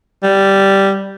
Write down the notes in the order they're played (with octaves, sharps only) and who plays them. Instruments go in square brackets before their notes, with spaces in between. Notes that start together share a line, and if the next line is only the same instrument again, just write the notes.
[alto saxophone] G3